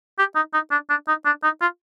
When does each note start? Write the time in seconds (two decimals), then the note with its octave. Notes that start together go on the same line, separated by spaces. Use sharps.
0.19 G4
0.35 D#4
0.53 D#4
0.71 D4
0.90 D4
1.08 D#4
1.26 D4
1.43 D#4
1.61 F4